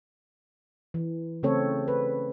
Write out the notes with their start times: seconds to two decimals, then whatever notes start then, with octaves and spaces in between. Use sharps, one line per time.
0.94 E3
1.43 C#3 A3 C4 A4 C#5
1.88 B4